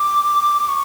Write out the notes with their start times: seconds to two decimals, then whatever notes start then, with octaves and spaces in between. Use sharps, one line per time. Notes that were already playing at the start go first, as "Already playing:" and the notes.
Already playing: D6
0.68 C#6